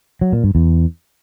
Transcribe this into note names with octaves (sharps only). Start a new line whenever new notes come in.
F#3
A#2
G2
E2